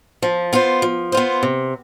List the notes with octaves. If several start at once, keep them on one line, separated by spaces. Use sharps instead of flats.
F3
B3 F4 C5
F3
B3 F4 C5
C3